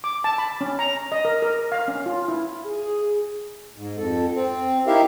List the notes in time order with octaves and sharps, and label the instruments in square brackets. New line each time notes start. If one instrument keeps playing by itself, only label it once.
[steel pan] D6
A5
B5
C#4
A#5
D#5
A#4
A#4
F5
C#4
F4
E4
[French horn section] G#4
[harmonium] G#2
F2 A4
C4
D#4 E4 G4 A#4 E5 F5